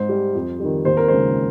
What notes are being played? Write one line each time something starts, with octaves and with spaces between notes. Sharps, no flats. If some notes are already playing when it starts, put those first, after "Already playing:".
Already playing: G#2 C5
G3
F2
D#3 G3
D#2 C5
A#4
C#3 F3 G#3 C5